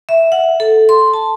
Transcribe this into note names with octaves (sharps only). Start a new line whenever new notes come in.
E5
F#5
A4
C6
A5